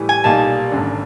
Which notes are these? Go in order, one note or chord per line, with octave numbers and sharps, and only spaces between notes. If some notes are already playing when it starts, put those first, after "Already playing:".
Already playing: A2 E3 G3
G#5
B1 A#2 G3 A#3 D#4 A5
G#1 F#2 D3